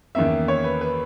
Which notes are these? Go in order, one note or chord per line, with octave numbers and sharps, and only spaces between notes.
E2 D#3 A#3 C#4 E5
C#5
B4
B4